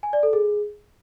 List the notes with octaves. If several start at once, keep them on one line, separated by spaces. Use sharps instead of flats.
G#5
D5
A4
G#4